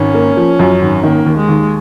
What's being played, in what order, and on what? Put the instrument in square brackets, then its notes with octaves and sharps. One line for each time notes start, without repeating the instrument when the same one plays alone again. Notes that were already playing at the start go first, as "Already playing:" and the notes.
Already playing: [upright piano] G#1 [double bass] C#4
[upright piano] A#3
F3
F#2
G#1
[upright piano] D#3 [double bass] A#3
[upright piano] D#2
[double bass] G#3
[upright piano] D#2